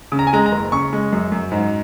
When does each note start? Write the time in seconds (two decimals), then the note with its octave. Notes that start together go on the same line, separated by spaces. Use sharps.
0.12 C#3
0.19 A#5
0.27 G#5
0.33 G#3 A#5
0.46 A#5
0.52 F#1
0.72 C#3 C#6
0.93 G#3
1.13 F#2
1.32 F#2
1.52 G#2